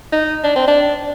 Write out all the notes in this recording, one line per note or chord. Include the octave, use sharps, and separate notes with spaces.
D#4
D4
C4
D4